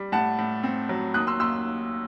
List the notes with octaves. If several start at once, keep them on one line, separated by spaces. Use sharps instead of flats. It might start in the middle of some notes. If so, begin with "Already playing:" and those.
Already playing: G3
A2 F#5 A5
A2
C4
F#3
D#2 D#6 F#6
C6 E6
D#2 C6 E6